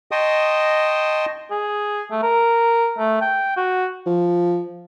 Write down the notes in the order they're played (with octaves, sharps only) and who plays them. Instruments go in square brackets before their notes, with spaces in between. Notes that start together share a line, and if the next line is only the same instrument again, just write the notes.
[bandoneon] D#5 G5 A5 C6 C#6 D#6
[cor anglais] G#4
A3
A#4
A3
G5
F#4
[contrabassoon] F3